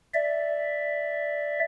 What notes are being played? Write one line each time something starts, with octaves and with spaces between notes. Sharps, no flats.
D5 E5